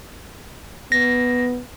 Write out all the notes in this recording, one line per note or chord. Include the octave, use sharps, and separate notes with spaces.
B3 A#6